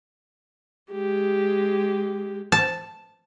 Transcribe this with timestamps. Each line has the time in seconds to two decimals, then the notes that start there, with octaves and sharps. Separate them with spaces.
0.91 G#3 G4
2.52 A5